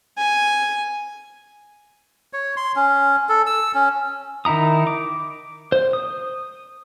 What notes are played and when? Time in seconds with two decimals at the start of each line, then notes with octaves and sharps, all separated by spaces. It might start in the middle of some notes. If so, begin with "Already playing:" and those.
0.18 G#5
2.33 C#5
2.57 C6
2.76 C#4
3.29 A4
3.46 E6
3.74 C#4
4.45 D#3 D#4 E4 A#5 D#6
4.87 D6
5.72 C5
5.93 D#6